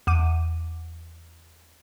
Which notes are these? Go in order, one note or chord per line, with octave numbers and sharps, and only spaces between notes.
E2 F#5 D6 D#7